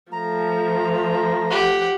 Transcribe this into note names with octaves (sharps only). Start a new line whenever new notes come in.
F3 A3 A#5
G4 F#5